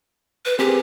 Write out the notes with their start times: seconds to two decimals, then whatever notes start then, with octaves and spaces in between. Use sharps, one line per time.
0.45 B4
0.59 C4 G4 G#4 A#4